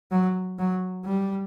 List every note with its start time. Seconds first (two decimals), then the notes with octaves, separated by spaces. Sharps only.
0.11 F#3
0.59 F#3
1.05 G3